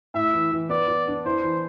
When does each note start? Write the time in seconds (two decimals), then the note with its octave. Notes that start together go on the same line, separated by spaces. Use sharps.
0.14 A2 E5
0.33 E3
0.52 E3
0.69 B3 D5
0.88 B3
1.08 D4
1.25 E4 C5
1.43 E3